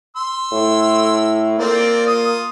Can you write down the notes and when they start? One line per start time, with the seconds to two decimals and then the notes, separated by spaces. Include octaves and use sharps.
0.16 C6 E6
0.53 A2
1.59 A#3 C4 F4 D5
2.07 F4 D#6